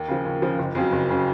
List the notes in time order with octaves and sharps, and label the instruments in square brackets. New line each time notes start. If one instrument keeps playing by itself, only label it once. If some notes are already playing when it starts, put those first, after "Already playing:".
Already playing: [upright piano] D#2
C#3 F3
D#2
C#3 F3
F#1
F2 C#3 F#3
F#1
C#3 F#3